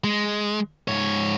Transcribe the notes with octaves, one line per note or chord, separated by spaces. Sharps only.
G#3
G#2 C#5